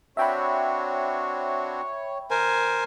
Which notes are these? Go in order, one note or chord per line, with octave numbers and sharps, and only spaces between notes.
C4 D4 F#4 C#5 E5 G5 B5
D#3 A#4 C5 G#5